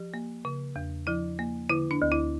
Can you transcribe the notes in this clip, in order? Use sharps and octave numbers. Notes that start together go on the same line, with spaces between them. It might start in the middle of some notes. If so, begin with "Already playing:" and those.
Already playing: F3 G4
A#3
C#3
E2
F3 E4
A#3
D3 E4
D4
D2
E4